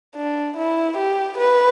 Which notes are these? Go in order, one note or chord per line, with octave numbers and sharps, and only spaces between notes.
D4
E4
G4
B4